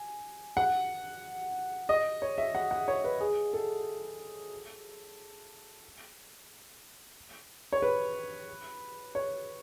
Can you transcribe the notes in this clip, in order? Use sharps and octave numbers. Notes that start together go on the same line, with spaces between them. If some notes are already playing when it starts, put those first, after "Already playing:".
Already playing: G#5
F#5
D#5
C#5
E5
F#5
F#5
C#5
B4
G#4
A4
C#5
B4
C#5